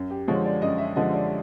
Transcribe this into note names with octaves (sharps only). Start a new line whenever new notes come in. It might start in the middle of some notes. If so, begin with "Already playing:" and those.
Already playing: F#2
G4
D3 F3 G#3 C#5
D5
F#2 D#5
E5
D3 F3 G#3 D#5
D5